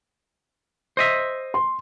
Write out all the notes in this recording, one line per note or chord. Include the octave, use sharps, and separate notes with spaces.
C5 D#5 E5
C6